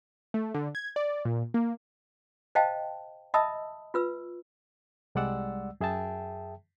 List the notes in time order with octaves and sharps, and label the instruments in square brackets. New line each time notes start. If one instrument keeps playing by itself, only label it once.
[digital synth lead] A3
D3
G#6
D5
A#2
A#3
[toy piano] C5 D#5 F5 G5 A5
D#5 E5 A5 B5 D#6 E6
F4 B4 E6
[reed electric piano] C2 G3 G#3 D5 F#5 E6
F#2 G#4 E5 G5 A5